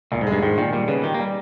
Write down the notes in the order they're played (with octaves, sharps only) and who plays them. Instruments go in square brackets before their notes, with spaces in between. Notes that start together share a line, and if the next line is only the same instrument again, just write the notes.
[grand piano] E1 [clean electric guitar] A#2
[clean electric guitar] G#2
[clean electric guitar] G2 [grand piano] G#3
[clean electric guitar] G#2 [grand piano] D#3
[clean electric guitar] A#2 [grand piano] D#3
[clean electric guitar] A#2 [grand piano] G3
[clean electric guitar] C#3 [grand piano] B3
[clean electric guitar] D#3 [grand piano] G4
[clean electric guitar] A#3
[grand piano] G3